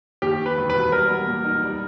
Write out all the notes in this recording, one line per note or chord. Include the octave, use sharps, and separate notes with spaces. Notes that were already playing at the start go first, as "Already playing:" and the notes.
D#2 G4
D#3
B4
E1
B4
E1
G3 A#4
B3
A#2
D#4
G3